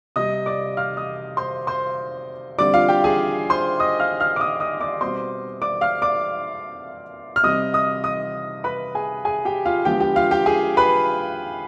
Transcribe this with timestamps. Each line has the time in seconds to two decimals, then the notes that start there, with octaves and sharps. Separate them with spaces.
0.16 C3 G3 C4 D#5 D#6
0.46 D5 D6
0.77 F5 F6
0.97 D#5 D#6
1.37 C5 C6
1.67 C5 C6
2.59 D3 G3 C4 D5 D6
2.74 F4 F5
2.89 G4 G5
3.04 G#4 G#5
3.50 C5 C6
3.80 D#5 D#6
4.00 F5 F6
4.20 F5 F6
4.36 D6
4.40 D#5 D#6
4.60 D#5 D#6
4.81 D5 D6
5.01 B2 G3 C4 C5 C6
5.62 D5 D6
5.81 F5 F6
6.02 D5 D6
7.36 F6
7.43 C3 G3 C4 D#5 D#6
7.73 D#5 D#6
8.04 D#5 D#6
8.64 B4 B5
8.95 G#4 G#5
9.25 G#4 G#5
9.45 G4 G5
9.66 F4 F5
9.85 D3 F3 G#3 B3 G4 G5
10.00 G4 G5
10.16 F4 F5
10.31 G4 G5
10.46 G#4 G#5
10.77 B4 B5